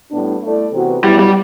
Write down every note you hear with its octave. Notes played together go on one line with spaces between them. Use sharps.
A2 G3 B3 D4
A3 E4 A4 D5
C3 E3 B3 F#4 B4
B2 F#3 G3 B3 E4
G3